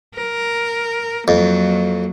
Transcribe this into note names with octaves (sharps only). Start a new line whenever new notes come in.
A#4
F2 F#3 A#3